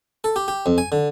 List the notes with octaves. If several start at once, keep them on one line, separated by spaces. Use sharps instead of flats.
A4
G4
G4
F2
G#5
D3